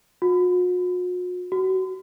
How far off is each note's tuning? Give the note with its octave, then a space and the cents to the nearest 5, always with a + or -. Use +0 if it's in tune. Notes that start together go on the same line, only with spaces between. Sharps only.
F#4 -45
F#4 +25